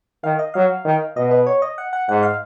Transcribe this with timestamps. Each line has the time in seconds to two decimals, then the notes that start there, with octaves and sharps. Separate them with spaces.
0.24 D#3 F5
0.39 D#5
0.54 F#3 F5
0.85 D#3
1.16 B2 D#5
1.31 B4
1.47 C#5
1.62 D#5
1.78 F#5
1.93 F#5
2.08 G#2 F#5
2.23 F5